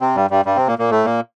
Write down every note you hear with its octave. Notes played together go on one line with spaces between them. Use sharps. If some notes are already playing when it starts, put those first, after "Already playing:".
C3 C4
G2 G3
G2 G3
G2 G3
C3 C4
A#2 A#3
A#2 A#3
A2 A3
A#2 A#3